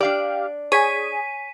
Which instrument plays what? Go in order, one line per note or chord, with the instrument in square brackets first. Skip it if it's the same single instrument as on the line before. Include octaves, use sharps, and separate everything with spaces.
[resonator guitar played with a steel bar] D4 D5 [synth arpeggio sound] G4 F5
[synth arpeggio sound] G#4 [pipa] C#5 [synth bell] G#5 B6 D#7